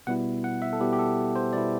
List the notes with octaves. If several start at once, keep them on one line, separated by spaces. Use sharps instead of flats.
B2 G3 B3 E4 F#5
F#5
E5
A4
B2 G3 B3 E4 G4
G4
A4
C5
B2 G3 B3 E4 D5